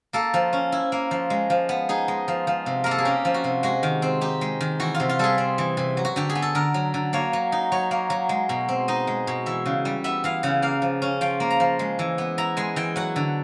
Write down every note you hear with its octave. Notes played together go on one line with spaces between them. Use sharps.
A#3 A4
F3
C#4
E4
A#3
F3
G#3
F3
B3
D#4 G#4
G#3
F3
F3
C3
A#3 A#4
A4
G#4
C#4 G4
F3
F#4
C3
G#3 F#4
D#3
C4
D#4 G4
G#3
D#3
E3 F#4
F4
C3
F4
G3 G#4 A4
C4
E3
C3
F#3
F#4
D3 G4
G#4
B3
A4
D3 A#4
F#3
D3
A#3 C#5
F#3
D#4
F#3 C#5
A#3
F#3
G#3
B2
C4
D#4 D#5
G#3
B2
E3 E5
C#3
G3
B3 E5
E3 F5
C#3 F#5
A#3 F5
F3
C#4
F3 G5
A#3
A#5
F3
G#3
E3
B3
E4 A#5
G#3 G#5
E3 G5
F#3 F#5
D3